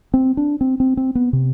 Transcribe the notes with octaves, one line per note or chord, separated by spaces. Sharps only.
C4
D4
C4
C4
C4
B3
C3